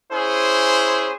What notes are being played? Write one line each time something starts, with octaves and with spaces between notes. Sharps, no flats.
C#4 E4 G#4 C5